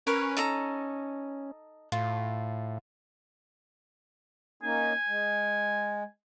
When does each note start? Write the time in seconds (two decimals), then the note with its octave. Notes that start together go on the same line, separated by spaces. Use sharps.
0.07 C#4 A#4 B4 C#5
0.37 D#4 A4 A#5
1.92 A2 F4
4.63 A#3 C#4 D#4 G#5
5.07 G#3